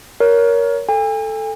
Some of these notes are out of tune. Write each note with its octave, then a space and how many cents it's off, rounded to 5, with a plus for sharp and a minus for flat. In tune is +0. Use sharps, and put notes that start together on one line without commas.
A#4 +10 C#5 +20
A4 +0 G#5 -45